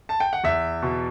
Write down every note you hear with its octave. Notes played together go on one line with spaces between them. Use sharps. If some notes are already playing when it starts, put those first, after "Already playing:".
A5
G5
F#5
E2 E5
B2